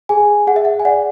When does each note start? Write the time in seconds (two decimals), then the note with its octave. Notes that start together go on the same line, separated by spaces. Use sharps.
0.09 G#4 G#5
0.47 G#4 F#5
0.56 E5
0.65 F#5
0.79 G#5
0.85 D5 F#5